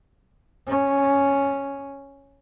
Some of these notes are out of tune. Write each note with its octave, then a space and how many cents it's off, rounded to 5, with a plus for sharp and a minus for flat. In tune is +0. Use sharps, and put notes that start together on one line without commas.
C#4 +0